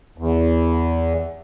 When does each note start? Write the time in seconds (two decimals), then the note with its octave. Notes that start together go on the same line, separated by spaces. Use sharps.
0.18 E2